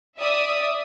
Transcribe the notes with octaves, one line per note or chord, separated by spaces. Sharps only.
D5 E5 D#6